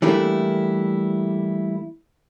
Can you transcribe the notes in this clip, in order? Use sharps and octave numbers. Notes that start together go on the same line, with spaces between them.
E3 G3 A3 A#3 D4 E4